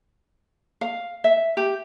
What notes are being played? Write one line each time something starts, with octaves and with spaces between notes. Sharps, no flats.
F5
E5
G4